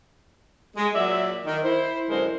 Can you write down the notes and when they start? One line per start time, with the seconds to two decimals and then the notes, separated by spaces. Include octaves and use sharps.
0.77 G#3
0.95 A#2 F#3 D5 E5
1.46 D#3
1.64 E4 C5
2.10 F#2 D3 E3 G#3 A#4 C5